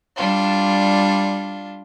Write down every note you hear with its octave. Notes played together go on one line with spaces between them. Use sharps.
G3 D4 F4